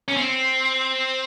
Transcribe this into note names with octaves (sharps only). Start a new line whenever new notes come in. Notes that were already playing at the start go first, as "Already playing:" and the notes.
C#4
C4